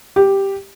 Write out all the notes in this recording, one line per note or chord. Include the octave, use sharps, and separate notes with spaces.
G4